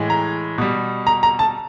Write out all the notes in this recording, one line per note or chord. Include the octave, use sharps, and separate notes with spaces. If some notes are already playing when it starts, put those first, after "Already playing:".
Already playing: A2 E3 G#3
A#5
B2 G3
A#5
A#5
A5